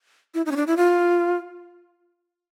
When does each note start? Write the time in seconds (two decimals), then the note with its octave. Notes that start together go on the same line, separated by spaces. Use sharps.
0.34 E4
0.46 D#4
0.51 C#4
0.56 D4
0.67 E4
0.77 F4